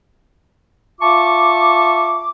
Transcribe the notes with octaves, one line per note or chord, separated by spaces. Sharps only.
F4 E5 A5 C#6 D6